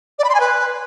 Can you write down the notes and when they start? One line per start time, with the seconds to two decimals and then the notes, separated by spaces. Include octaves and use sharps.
0.18 D5
0.24 B5
0.29 C6
0.34 G#5
0.40 B4